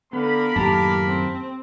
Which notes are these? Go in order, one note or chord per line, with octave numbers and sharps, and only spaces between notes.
D3 B3 A#4 F5 B5
F#2 A2 D#3 A#3 G4 A5 A#5
C4